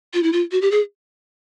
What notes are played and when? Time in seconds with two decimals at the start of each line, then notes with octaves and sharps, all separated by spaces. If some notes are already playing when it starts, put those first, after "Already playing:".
0.14 F4
0.23 E4
0.33 F4
0.52 F#4
0.62 G4
0.71 G#4